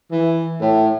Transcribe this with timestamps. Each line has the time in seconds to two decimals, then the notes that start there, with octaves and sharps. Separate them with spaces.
0.11 E3
0.60 A2